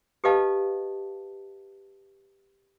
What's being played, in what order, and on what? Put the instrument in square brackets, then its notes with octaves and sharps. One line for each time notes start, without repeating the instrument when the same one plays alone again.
[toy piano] G4 A4 B4 D#5 F5 A5